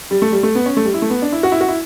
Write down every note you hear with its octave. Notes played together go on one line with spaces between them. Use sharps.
G3
A3
G3
A3
B3
C#4
A3
G3
E4
A3
B3
D4
E4
F#4
E4
F#4
E4